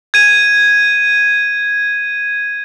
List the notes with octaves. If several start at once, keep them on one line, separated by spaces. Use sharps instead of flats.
G#6 D#7